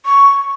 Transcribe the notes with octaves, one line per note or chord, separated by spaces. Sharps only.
C#6